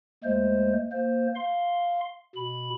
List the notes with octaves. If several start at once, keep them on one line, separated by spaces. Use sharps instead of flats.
D#2 G#3 A3 C5
A#3 C5
F5 C6
B2 B5